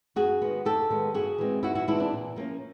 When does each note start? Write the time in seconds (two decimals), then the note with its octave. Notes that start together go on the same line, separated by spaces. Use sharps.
0.16 F#2 F#4 G#4
0.42 D#3 G#3 B3
0.65 F#2 G4 A4
0.90 D#3 G#3 B3
1.14 G2 F#4 G#4
1.38 E3 G#3 C4
1.63 G2 E4 F#4
1.75 E4 F#4
1.88 E3 G#3 C4 D4 E4
2.00 D4
2.12 A#2
2.36 F3 A#3 C#4